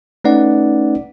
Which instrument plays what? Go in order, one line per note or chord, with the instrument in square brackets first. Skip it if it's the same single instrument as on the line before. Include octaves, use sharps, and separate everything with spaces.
[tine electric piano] A3 C#4 D#4 B4 D5 F#5